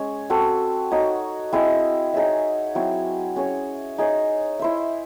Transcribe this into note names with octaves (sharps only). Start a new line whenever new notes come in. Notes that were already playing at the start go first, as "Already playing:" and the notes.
Already playing: G#3 C#4 G#4 C#5
C4 F#4 A4
D#4 F#4 C#5
C4 E4 G#4 D#5
D#4 G#4 C#5 E5
F#3 C4 E4
C#4 G#4 C#5
D#4 G#4 C#5
E4 C5 E5